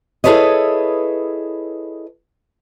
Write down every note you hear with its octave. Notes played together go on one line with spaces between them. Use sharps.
E4 G#4 A4 B4 C#5 D#5